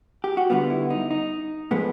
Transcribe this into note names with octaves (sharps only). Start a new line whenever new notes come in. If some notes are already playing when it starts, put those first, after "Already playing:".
G4
F#4
D3 G3 B3 F4
E4
D#4
D#4
A2 F3 G#3 B3